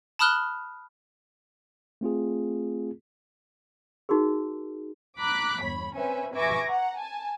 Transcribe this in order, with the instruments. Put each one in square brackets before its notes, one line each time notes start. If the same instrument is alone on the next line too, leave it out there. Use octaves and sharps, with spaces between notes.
[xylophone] A5 B5 D#6 F6 F#6 G7
[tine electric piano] A3 C4 F4 G#4
[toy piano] D#4 F#4 G#4 A#4
[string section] A#5 B5 D6 F#6 B6
G1 E2 C#5 B5
C4 C#4 B4 C5 E5 G#5
B4 E5 G#5 C#6 D6 A#6
F#5 A#5
G#5 A5